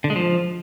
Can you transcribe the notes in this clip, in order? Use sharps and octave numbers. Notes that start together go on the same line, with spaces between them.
D3
G#3
F3